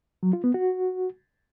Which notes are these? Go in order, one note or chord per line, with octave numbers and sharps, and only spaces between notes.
F#3
F4
B3
F#4